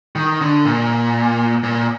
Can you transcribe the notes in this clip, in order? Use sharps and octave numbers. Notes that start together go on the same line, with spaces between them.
D#3
D3
A#2
A#2